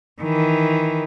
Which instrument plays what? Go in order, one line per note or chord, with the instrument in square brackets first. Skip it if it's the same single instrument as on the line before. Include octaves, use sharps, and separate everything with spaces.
[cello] D#3 E3